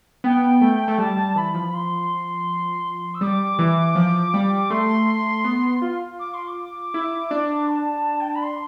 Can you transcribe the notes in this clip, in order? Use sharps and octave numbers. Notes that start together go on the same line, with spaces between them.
B3 G5
A3
A3
G3 A5
G3
E3 B5
F3
C6
E6
G3 D6
E3
F3
G3
A3 C6
B3
F4
D6
C6
D6
E4
D4
A5
G5
A5
B5
C6